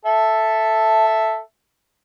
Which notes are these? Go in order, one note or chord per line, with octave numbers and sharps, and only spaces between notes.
A4 E5